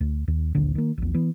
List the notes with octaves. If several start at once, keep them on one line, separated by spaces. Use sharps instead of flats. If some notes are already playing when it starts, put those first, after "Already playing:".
D2
D#2
D1 A#1 D#2 D3
D#3 A#3
A#1 E2
E3 B3